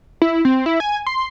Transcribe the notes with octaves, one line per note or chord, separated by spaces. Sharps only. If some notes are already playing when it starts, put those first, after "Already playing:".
E4
C4
E4
G#5
C6